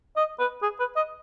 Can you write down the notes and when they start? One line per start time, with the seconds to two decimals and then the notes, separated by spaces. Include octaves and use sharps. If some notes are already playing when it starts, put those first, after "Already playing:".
0.16 D#5
0.39 B4
0.62 G#4
0.80 B4
0.96 D#5